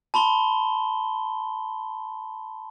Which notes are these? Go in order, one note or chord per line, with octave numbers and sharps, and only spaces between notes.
A5 B5 C6 G7